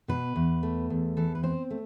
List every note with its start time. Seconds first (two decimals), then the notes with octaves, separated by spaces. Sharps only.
0.08 B2 B4
0.36 E2
0.63 A3
0.90 E2
1.17 E3 A4
1.35 B4
1.43 C4 C5
1.71 A3